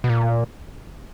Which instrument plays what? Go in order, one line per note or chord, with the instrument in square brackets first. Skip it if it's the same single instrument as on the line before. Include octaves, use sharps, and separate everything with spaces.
[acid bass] B2
A#2